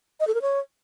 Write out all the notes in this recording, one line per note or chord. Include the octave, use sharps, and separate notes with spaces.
D#5
A4
A#4
C#5